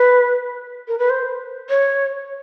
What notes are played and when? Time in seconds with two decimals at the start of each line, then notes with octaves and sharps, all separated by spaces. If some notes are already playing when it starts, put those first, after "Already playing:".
Already playing: B4
0.88 A#4
0.98 B4
1.10 C5
1.70 C#5